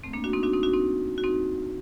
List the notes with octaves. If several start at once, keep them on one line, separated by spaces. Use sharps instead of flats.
A3 C4
A#3 D4
D4 F#4
C4 D#4
D4 F#4
C4 D#4
D4 F#4
C4 D#4
F#4
C4 D#4